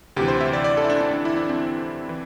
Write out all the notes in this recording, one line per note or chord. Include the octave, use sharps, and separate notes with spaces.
D2 C3 E3 G4
C5
E5
D5
D5
A4
E4
D4
D4
D4
E4
D4
C4
E3